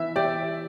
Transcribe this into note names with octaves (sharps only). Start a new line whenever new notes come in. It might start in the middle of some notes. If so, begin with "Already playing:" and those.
Already playing: E3 E5
G4 D5